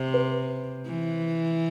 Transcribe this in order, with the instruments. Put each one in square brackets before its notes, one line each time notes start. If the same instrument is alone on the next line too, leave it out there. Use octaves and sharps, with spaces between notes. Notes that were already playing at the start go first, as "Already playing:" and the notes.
Already playing: [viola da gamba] C3 [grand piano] C5
[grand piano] B4
[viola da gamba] E3